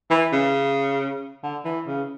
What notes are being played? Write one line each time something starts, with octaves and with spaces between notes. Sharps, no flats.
E3
C#3
D3
E3
C#3